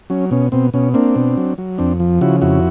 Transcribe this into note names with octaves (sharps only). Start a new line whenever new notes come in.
F#3 C#4
B2 C#4
B2 C4
B2 C#4
A#3 C4 D4
B2
F#3
F#3
F2 C4 D4
F3
C#3 E4 F#4
F2 E4 F#4